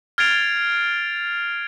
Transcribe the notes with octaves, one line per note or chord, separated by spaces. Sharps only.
F6 G#6 A6 C7 D7 F7